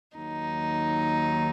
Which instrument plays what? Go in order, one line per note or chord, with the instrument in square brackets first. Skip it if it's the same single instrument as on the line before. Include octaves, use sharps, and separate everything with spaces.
[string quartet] D#2 D#3 F#3 D#4